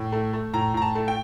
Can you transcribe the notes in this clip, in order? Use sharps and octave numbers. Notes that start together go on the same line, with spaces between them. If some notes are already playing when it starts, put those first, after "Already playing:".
Already playing: A2
A3
A3
A2 A#5
A2 A#5
A5
A3
G5